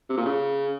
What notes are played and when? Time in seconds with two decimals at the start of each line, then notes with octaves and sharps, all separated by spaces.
0.09 C3
0.17 A#2
0.25 C#3